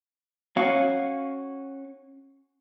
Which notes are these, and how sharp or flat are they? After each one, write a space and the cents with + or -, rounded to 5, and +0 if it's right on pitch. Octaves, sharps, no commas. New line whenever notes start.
C#4 -20 F#4 +0 F5 +0